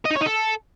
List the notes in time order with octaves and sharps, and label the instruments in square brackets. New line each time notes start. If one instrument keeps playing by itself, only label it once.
[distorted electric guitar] D#5
D#4
C#5
D#4
A4